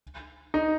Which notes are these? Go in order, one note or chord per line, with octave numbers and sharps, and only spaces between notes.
D#4